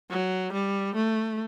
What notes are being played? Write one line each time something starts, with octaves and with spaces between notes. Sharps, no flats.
F#3
G3
A3